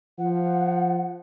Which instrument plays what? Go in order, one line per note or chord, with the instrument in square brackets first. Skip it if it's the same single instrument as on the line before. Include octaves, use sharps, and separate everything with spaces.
[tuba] F3 [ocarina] F#5